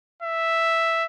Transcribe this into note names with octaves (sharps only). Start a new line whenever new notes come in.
E5